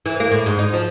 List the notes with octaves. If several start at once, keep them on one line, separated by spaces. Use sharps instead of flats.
E3
A#3
A2
G#2
D#4
F3